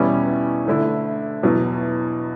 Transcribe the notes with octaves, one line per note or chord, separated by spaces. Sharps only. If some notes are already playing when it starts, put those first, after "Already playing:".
Already playing: E2 B2 G3 C#4 E4
D2 D3 A3 E4
E2 B2 F#3